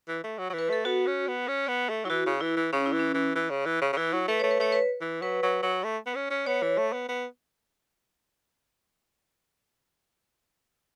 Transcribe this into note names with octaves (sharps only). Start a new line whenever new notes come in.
E3
A3
F#3
F#3
E3 B4
A3 A4
B3 F#4
C#4
B3
C#4
B3
A3
F#3 E4
E3 F#4
C#3
E3 E4
E3
C#3 C#4
E4
E3
C#4
E3
E3
C#3
E3
C#3
C#3
E3 E4
F#3
A3 B4
A3 C#5
B4
A3 C#5
B4
E3
F#3 B4
F#3
F#3
A3
B3
C#4
C#4
B3 C#5
E3
A3
B3
B3